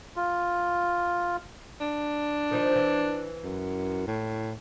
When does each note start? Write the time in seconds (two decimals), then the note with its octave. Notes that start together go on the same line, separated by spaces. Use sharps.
0.16 F4
1.80 D4
2.51 D#3 F3 D#4
2.76 E3
3.44 F#2
4.08 A2